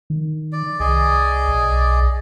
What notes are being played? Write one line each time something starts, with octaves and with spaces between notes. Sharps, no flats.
D#3
D5
C2 G#4 D5 D#5
B1